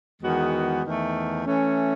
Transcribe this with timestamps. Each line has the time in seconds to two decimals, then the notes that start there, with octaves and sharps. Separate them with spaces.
0.21 E2 D#3 G#3 B3 F#4
0.83 E2 D#3 A3
1.45 E3 A3 C#4